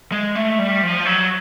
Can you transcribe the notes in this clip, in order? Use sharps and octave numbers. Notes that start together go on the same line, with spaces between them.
G#3
A3
G3
F3
F#3